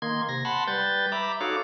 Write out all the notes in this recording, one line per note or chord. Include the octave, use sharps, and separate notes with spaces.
D#3 A#3 C6 G#6
C3 A#6
F#5 A5 B5 C6
G3 B4 G6 A6
E5 A#5 B5 D6
D#4 F#4 A4 C#5 F5 D6